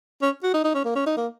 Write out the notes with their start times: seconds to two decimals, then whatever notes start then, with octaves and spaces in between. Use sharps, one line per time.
0.22 C#4
0.43 F#4
0.54 D#4
0.64 D#4
0.74 C#4
0.85 A#3
0.96 C#4
1.06 D#4
1.17 A#3